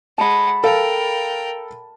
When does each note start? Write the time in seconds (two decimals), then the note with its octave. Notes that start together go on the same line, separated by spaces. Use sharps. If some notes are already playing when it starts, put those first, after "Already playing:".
0.18 G#3 F#5 A5 B5
0.64 A4 A#4 F5 G5